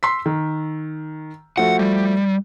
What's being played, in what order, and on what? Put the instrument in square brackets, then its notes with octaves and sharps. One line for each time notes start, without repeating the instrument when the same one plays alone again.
[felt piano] C6 E6 B6
D#3
[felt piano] F3 A3 F#4 [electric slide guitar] F#5
[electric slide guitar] G3